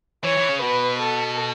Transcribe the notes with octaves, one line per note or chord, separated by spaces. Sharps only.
E3 C#5
E3
C#3
B2 B4
A4